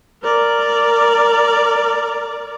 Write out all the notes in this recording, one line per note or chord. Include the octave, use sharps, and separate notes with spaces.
A#4 D5